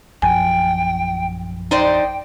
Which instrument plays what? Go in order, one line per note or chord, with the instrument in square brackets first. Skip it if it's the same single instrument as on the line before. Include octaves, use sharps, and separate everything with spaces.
[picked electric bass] A#1 F#2 F3 [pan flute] G5 [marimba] G#5
[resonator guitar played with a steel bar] D#4 C5 D5 [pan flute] G5